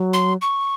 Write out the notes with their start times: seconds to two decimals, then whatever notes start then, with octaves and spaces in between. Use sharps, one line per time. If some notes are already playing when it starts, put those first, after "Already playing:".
Already playing: F#3
0.13 C6
0.42 C#6